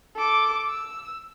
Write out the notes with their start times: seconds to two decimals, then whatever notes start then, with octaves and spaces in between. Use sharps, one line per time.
0.16 A4 D6
0.69 E6